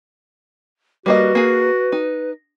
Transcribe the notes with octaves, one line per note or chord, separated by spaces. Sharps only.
G3 A#3 F#4 B4 D#5
A#3 G#4
D#4